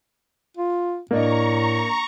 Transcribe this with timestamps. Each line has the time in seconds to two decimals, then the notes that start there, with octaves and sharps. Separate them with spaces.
0.57 F4
1.11 A2 A#3 D4 D#5 A#5 C#6